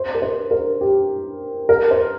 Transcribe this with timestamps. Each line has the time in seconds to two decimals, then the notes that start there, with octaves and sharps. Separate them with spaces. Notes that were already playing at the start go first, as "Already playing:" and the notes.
Already playing: C5
0.15 A#4
0.22 C5
0.51 A#4
0.81 G4
1.69 A#4
1.91 C5